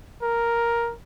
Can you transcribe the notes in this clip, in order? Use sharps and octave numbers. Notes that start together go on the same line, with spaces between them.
A#4